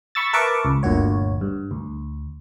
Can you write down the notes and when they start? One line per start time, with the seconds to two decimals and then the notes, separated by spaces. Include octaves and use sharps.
0.15 B5 C#6 E6 A6
0.33 A#4 B4 E5 A5 C#6 D6
0.65 C#2
0.83 G1 D2 A#2 F#4 C#5
1.41 G2
1.71 D2